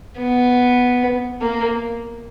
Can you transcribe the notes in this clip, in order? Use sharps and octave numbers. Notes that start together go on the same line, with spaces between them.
B3
A#3